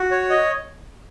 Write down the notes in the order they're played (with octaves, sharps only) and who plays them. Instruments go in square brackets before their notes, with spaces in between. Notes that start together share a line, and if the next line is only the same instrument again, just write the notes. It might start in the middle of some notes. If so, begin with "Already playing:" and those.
Already playing: [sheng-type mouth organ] F#4
C#5
D#5